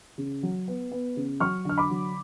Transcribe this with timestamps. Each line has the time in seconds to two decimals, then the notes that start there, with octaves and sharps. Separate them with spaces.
0.18 C#3
0.43 F#3
0.68 B3
0.92 B3
1.17 C#3
1.40 F#3 C#6 F6
1.65 D3 F6
1.78 B5 D6
1.91 F#3